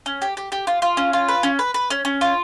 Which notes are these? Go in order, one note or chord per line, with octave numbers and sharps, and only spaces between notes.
C#4
G4
G4
G4
F4
F4
C#4
F4
B4
C#4
B4
B4
C#4
C#4
F4